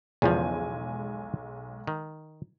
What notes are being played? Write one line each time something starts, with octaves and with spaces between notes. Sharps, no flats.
B1 E2 C#3 F3 G#3 G#5
D#3